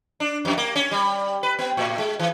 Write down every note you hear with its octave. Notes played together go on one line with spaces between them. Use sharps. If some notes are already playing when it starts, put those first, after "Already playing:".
D4
F2
A#3
C#4
G3
B4
B3
A2
G#3
E3